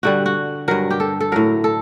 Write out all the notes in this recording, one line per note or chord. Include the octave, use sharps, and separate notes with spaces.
G2 D3 G3 F#4
F#4
G2 F#3 A#4
G4
A4
A4
A2 F#3 A#4
A4